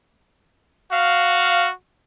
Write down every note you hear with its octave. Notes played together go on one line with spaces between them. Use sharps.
F#4 F5